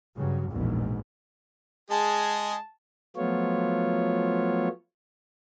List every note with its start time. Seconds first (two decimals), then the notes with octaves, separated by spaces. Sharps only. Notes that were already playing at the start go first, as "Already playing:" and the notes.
0.16 G2 C#3 F#3
0.51 F1 A#1 E2 G#2 B2
1.90 G#3 G#4 A5
3.16 F3 F#3 A3 B3 F4 C#5